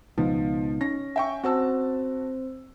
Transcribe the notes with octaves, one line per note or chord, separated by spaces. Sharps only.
C#2 B2 F3 B3 D#4
C#4 A#6
E5 G5 G#5 C#6
C4 F#4 C5 A5 E6